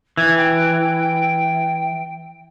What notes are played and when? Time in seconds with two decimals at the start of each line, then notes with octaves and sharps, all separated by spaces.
0.17 E3 G#6
0.37 G5